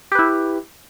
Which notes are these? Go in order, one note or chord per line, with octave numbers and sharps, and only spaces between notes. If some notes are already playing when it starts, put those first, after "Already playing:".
E4 G4 B4